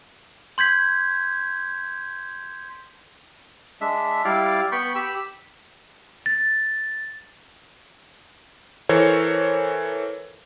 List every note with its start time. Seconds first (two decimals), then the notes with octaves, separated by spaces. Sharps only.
0.58 C6 G6 G#6 B6
3.81 G#3 D4 E5
4.25 G3 E4 D5 F5
4.72 B3 G5 B5 C#6
4.95 G4 B5 E6
6.26 A6
8.89 E3 A4 A#4 C5 C#5